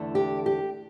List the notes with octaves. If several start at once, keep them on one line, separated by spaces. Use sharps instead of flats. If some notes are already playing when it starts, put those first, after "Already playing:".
Already playing: E2 D3 A3 D4
G4
G4